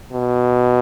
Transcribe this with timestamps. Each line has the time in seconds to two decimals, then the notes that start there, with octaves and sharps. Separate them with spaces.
0.12 B2